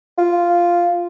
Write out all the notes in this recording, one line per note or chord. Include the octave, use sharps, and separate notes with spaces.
F4